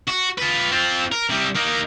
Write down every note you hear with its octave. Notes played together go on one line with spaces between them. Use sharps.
F#4
F4 B4
C4 F4
A#4
C3 G3
A#3 D#4